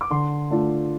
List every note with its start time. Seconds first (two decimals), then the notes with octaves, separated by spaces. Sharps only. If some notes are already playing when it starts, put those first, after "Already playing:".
0.01 D6
0.10 D3 C6
0.50 A3 D4 F4